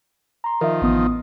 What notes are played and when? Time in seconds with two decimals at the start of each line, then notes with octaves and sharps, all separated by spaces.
0.44 A#5 C6
0.61 D#3 F3 A#4 E5
0.82 A1 B3 D#6